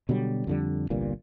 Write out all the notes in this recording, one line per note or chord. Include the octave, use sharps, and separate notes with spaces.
B2 D3 F#3 G3
F2 D3 G3
G1 C2 G2 A#2